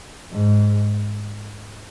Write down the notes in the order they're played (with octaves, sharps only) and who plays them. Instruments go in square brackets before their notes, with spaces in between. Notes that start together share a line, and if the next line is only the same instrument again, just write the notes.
[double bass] G#2